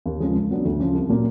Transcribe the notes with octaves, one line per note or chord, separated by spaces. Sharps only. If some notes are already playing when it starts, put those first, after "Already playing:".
D#2
C#3 F3 G#3
C#2
C#3 F#3 B3 D4
D2
C#3 F3
C2
A#2 F#3 A#3